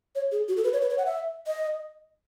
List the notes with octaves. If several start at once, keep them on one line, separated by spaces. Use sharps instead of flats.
C#5
G#4
F#4
A4
B4
C#5
B4
C#5
F#5
E5
D#5